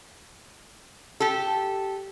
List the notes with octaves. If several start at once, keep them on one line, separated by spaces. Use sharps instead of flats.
G4 A4